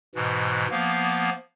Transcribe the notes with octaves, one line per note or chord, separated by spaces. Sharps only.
G#2 B2 E3
F3 A#3 B3